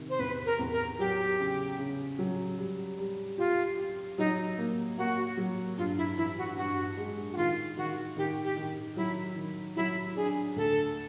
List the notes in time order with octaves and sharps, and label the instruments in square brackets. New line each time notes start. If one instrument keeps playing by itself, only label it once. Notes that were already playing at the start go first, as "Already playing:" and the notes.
Already playing: [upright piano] C3 D#3
[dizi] C5
[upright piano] E2 [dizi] B4
[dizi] A#4
[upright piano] E2
[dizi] A#4
[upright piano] F#3 [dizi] G4
[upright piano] C#3
C#3
F#3
G3
G3
[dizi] F4 [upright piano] G4
[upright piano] G4
[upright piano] F#3 [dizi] D#4
[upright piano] A#3
[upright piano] A#3 [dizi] F#4
[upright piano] F#3
[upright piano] G2 [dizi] F4
[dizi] E4
[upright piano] E3 [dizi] E4
[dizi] F#4
[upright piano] G2 [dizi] F#4
[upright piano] G#3
[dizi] F#4
[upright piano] D#3 [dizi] F4
[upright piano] D#3 [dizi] F#4
[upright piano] D#3 [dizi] G4
[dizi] G4
[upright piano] D#3
[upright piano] F#3 [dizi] E4
[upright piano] D#3
[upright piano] F#3 [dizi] E4
[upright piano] D4 [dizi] G#4
[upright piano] D2 [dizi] A4